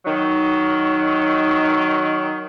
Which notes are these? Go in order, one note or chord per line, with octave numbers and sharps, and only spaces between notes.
D#3 F#3 D#4